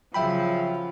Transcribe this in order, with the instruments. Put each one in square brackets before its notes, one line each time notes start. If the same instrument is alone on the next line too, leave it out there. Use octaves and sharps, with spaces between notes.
[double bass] C#3 F#3 [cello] F3 [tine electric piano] E5 G5 B5